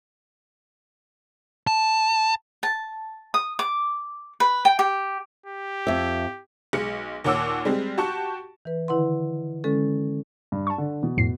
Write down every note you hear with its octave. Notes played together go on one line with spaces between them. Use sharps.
A5
A5
D#6
D6
B4
G5
G4
G4
F2 E5
B1 G#3 C#7
D#2 A#2 C#5 F#5 D6 E6
G3 G#3 C4
F#4 G4 A5 C#6
E3 B4
D3 D#3 E4 B4 F#5 C6
D3 G#3 C#4 A4
G2
A5 C#6
D3
B2 E3
F2 A2 C7